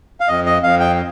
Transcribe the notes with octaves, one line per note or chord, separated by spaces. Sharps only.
F5
F2 D#5
D#5
F2 F5
G5